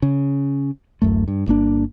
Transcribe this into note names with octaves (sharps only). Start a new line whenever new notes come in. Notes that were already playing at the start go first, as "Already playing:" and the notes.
C#3
D1 F#2 A3
G2
G1 A#3 D4